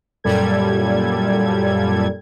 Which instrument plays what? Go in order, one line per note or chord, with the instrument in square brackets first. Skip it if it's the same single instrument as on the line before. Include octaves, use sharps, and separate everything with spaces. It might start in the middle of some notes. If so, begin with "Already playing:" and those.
[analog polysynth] F#2 A#2 G3 A4 G#6